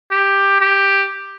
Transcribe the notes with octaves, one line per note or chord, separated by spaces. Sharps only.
G4
G4